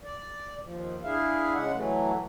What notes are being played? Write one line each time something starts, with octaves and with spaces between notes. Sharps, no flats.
D5
D#2 F3
D4 E4 G#4 E5 F5
C#3 G#3 F#5
E3 F#3 A3